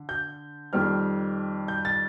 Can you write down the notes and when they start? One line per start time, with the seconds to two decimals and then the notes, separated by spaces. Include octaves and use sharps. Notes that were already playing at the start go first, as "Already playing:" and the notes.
Already playing: D3
0.09 G6
0.73 F2 D#3 G3 C4 F6
1.68 G6
1.85 A6